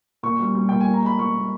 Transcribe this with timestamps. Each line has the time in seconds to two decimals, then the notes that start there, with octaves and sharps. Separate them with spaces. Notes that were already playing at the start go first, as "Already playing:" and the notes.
0.23 A#2 C#6
0.39 G3
0.55 G3
0.69 A#2 G5
0.81 G#5
0.86 A#2
0.94 A#5
1.03 G#3 B5
1.19 A#2 C#6
1.34 A#2